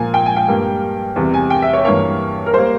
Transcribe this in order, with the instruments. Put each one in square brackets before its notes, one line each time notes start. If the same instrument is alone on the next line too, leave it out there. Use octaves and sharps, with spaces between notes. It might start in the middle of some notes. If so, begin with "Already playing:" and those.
Already playing: [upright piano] A#2 F3 A#3 G#5
G5
G#5
G5
G2 G3 A#3
E2 C3 G3
G#5
G5
E5
C#5
G2 E3 A#3 C#5
A#4
G3 A#3 C5